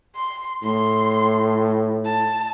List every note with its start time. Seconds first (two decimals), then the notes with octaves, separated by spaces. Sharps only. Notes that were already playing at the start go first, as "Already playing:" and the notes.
0.16 C6
0.63 A2 C6
2.05 A5